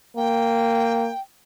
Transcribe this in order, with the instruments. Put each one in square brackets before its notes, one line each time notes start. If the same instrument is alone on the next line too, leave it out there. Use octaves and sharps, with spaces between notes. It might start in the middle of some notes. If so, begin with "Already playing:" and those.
[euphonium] A#3 [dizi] G5